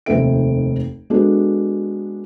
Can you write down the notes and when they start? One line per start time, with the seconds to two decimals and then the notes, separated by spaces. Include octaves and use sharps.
0.06 F1 D#2 C4 A4 E5 D7
1.10 G#3 B3 D4 F#4 A4